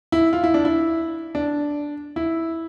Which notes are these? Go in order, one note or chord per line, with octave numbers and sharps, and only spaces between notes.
E4
F4
E4
D4
E4
D4
E4